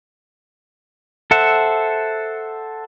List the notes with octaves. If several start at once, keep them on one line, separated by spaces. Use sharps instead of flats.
A4 C5 E5 F#5